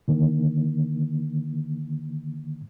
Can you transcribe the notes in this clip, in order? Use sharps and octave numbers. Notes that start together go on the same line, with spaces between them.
D3 D#3 A#3